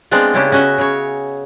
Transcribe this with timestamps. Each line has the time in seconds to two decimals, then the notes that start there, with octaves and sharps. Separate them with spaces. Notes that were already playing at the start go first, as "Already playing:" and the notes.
0.11 G#3 B3 C4 D4 D5 F5
0.34 C#3 C#4 D4 E4 G4
0.52 C#4 F#4 D#5 E5 F#5
0.78 C#3 C#5